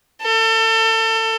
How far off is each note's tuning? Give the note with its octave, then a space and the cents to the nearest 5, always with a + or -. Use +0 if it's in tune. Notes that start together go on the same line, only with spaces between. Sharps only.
A4 +30